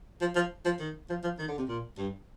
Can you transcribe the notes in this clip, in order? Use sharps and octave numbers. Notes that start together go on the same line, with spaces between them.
F3
F3
F3
D#3
F3
F3
D#3
D3
C3
A#2
G2